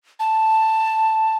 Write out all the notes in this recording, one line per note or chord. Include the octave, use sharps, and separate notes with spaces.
A5